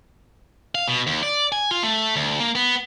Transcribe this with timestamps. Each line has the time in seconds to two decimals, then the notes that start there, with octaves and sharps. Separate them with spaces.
0.75 F5
0.88 B2
1.07 D#2
1.23 D5
1.52 G#5
1.71 F4
1.83 A3
2.16 D2
2.40 A#3
2.55 B3